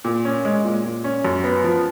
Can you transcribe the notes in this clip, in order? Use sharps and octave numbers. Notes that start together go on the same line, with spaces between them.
A#2
C#4
G#3
A#2
A#2
C#4
F#2
B3
F3